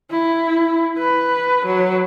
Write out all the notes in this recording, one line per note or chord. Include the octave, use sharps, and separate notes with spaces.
E4
B4
F#3